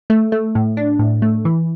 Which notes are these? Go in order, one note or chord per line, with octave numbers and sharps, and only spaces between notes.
A3
A3
A2
D4
A2
A3
E3